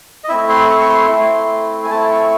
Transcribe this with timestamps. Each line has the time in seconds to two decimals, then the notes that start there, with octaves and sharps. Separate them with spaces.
0.24 D#5
0.29 A3 C4 E4 E5
0.49 C6
0.70 C#6
0.80 C#6
0.89 C6
1.10 A3 C4 E4
1.84 G#5
1.90 A3 C4 E4 A5
2.11 C#6